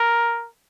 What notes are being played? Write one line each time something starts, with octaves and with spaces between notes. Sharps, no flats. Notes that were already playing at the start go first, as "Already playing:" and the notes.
Already playing: A#4